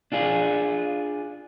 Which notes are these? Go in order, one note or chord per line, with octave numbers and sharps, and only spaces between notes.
D4 F4 G#4